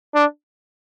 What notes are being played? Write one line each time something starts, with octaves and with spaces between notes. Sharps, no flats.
D4